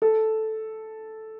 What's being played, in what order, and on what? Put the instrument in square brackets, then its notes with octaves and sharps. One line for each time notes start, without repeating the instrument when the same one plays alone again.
[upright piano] A4